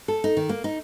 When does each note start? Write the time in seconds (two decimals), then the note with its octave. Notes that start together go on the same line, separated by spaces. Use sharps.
0.08 A4
0.24 D#4
0.37 D#3
0.49 A#3
0.64 D#4